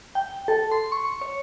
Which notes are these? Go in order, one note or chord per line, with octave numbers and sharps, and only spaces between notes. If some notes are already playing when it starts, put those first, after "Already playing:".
G5
A4
C6
C#6
C#5